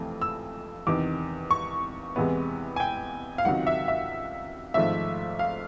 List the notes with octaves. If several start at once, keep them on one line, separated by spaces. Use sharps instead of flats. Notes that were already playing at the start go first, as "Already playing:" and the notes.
Already playing: F2 C3 E3 A3
E6
E2 C3 D#3 D6
C#6
E2 C3 E3 G#3 B3
G#5
G5
F5
C#2 C3 D#3 F#3 F#5
E5
E5
G#1 G#2 F3 A3 E5
F5